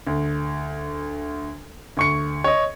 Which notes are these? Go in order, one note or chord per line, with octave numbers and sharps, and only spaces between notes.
D2
D2 C#6 C#7
C#5 D#5